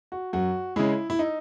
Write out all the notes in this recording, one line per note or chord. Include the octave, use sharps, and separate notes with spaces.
F#4
F#2 F#4
C#3 G#3 E4
E4
D#4